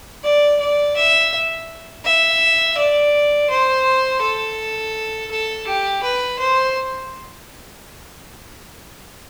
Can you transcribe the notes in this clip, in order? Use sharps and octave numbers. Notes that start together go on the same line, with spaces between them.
D5
D5
E5
E5
D5
C5
A4
A4
G4
B4
C5